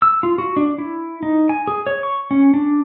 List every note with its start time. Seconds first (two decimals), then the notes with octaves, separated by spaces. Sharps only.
0.02 E6
0.23 F4
0.38 F#4
0.57 D4
0.78 E4
1.23 D#4
1.49 G#5
1.67 G#4
1.87 C#5
2.03 C#6
2.31 C#4
2.54 D4